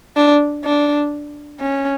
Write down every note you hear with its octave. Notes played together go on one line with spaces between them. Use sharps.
D4
D4
C#4